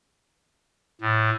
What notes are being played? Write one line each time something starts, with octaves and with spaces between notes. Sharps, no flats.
A2